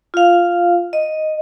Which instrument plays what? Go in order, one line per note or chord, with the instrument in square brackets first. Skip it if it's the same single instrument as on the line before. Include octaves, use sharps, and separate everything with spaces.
[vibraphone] F4 F5
D#5